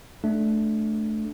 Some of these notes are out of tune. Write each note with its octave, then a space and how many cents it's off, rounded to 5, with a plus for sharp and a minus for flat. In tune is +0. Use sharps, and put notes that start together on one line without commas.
A3 -15 D4 +0